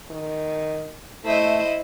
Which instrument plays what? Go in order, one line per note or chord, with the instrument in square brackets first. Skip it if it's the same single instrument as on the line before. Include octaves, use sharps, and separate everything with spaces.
[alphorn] D#3
[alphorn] A3 [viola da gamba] E4 C5 D#5